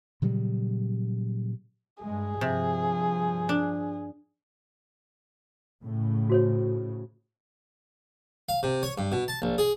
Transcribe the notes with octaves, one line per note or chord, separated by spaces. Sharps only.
A#2 C#3 F#3 G3
G2 G#3 G#4
G2 C3 F3
D4
A2 C#3
F#4 C5 C#5
F5
C3
C#5
G2
B2
A5
A#1
G#4